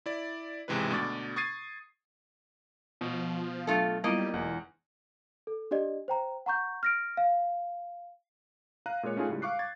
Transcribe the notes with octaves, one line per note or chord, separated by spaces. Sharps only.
E4 D5
G#1 C#2 C3 E3 G#3 B4
D2 B2 D4 C#6 D6 A6
C#6 D#6 G#6 A6 C7 D#7
B2 F3
F#3 A3 D4 F4 A4
G3 A#3 B3 E4 F4 D#5
E1 E2
A4
D4 G4 D5 D#5
C5 G5 A#5
F#5 A#5 C#6 G6
F6 A#6 D7
F5
F5 A#5 F#6 D#7
A#2 G#3 F4 C#5 C#7
A3 C#4 D#4 F4 G#4 G#5
C#2 A2 G3
F5 C#6 D6 F#6 C7
G#6 A6